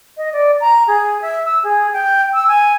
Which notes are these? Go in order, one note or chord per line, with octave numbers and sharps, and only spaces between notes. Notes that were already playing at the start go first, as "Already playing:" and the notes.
D#5
D5
A#5
G#4
E5
E6
G#4
G5
E6
G#5